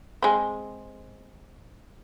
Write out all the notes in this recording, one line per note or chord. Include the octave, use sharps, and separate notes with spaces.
G#3 C4